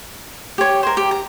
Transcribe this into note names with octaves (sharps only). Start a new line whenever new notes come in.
G4 C#5
A#4 C5
G4
A#5